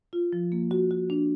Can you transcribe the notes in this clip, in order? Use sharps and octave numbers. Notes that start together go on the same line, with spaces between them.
F4
F3
A#3
F#4
F#4
D4